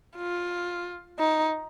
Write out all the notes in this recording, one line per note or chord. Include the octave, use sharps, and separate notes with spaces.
F4
D#4